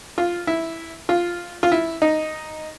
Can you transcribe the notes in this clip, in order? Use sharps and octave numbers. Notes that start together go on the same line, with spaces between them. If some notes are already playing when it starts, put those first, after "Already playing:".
F4
E4
F4
F4
E4
D#4